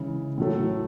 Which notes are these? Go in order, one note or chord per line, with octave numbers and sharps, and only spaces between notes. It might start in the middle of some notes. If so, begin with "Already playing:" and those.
Already playing: C#3 E3 G#3
A2 F#3 A3